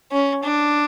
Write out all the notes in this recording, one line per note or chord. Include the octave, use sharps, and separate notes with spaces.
C#4
D4